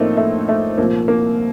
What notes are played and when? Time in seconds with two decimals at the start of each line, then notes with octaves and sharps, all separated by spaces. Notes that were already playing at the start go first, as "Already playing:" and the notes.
Already playing: A2 F3 A3 A#3 C4 D#4
0.17 A3
0.49 A3
0.78 C2 A#2 F3 A#3
1.08 A#3